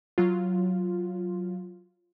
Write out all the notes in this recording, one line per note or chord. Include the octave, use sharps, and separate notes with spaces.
F#3 F4